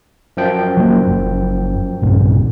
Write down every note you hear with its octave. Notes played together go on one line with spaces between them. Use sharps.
F#2 F3 G5
F#3 A#3
F#1
A#1 G2 C3